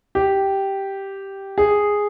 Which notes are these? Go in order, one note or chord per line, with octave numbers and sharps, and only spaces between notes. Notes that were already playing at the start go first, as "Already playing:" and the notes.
G4
G#4